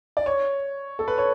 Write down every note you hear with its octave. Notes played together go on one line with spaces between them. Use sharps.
D5
C#5
A4
B4
C#5